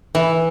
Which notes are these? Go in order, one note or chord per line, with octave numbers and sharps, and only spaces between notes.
E3